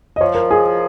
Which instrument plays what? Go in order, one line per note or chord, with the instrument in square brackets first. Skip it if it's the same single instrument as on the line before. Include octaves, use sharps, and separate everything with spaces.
[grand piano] D#5
[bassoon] F3 [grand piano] C#5
[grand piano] A#4
G#4